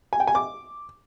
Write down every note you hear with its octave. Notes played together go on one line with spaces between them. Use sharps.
G#5
G5
G#5
D6